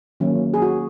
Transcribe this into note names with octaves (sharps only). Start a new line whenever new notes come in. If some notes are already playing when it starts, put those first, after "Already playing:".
D#3 F#3 A#3 C#4
G#4
F#4